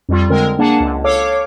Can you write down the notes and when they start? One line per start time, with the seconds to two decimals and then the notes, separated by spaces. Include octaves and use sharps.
0.09 F2 G3 F4
0.30 D3 G#3 C4 A#4
0.59 A#3 D4 G#4 F#5 A5
0.80 C#2
1.04 A4 C#5 F5 D6